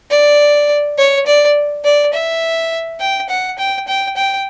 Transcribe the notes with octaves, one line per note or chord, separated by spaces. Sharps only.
D5
C#5
D5
D5
E5
G5
F#5
G5
G5
G5